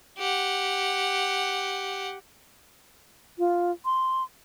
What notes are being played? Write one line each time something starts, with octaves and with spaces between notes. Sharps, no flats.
G4 F#5
F4
C6